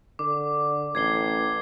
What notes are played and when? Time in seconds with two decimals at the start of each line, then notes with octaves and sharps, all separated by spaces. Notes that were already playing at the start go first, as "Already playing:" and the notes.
0.19 D3 D6
0.95 A1 G#6 C7 G7